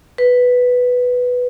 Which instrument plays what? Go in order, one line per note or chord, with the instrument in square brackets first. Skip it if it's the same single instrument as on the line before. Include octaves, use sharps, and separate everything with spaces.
[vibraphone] B4